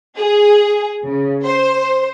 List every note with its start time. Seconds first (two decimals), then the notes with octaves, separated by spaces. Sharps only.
0.17 G#4
1.05 C#3
1.44 C5